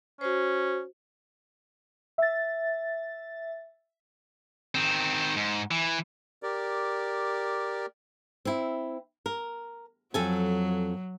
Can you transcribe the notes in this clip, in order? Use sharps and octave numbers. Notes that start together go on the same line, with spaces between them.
C#4 F#4 C5
E5 A6
D#3 C4
G#2
E3
G4 A#4 D5
C4 E4
A#4
F2 F#3 A4 G#5